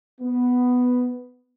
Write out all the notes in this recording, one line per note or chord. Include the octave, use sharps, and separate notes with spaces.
B3